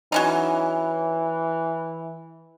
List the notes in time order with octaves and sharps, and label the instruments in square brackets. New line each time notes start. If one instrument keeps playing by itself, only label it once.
[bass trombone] E3 [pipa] F#3 C#4 D#4